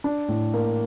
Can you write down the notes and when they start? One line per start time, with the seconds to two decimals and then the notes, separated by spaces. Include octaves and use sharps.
0.04 D4
0.29 A2
0.54 A#3